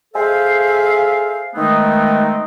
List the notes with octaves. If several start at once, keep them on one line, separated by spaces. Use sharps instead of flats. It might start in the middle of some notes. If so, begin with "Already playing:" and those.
G#4 A4 C5 E5 F5
D#3 G#3 A3 B3 C4 D#4